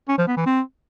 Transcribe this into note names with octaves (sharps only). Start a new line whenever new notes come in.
C#4
F3
B3
E3
C4